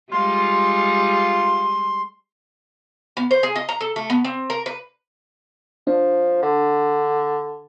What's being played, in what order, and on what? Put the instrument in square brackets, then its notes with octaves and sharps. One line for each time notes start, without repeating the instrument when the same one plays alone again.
[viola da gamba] G3 G#3 [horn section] F4 [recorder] C6
[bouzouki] B3
C5
G#4
D#5
A#5
A4
A3
B3
C4
A#4
B4
[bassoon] F3 [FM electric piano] D4
[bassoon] D3